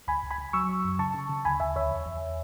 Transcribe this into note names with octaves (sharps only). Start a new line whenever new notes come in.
C#2 G#5 B5
C#2
G#5 B5
C#2
F#3 C#6 E6
F#3
F#2
C#3 A5 C#6
C#3
C#3
D2 G#5 B5
D2 E5 G#5
D2 C#5 E5
E2
E2